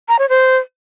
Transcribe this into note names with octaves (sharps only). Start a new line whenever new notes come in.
A#5
C#5
C5